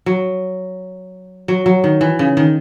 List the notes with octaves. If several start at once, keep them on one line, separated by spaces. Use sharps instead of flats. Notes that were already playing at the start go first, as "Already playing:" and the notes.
F#3
F#3
F#3
D#3
E3
C#3
D#3